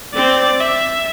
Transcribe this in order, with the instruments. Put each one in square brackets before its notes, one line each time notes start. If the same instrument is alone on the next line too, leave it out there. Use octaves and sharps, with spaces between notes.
[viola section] C4 [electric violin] D5
[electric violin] E5